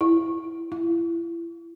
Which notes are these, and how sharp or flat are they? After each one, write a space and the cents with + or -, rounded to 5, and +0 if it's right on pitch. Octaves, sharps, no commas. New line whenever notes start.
E4 +5
E4 +30